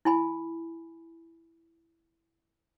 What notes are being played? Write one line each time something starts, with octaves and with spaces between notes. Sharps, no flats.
E4 G#5 B5